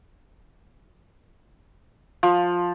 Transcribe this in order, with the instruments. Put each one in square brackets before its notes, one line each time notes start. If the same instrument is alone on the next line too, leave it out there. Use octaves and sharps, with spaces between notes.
[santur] F3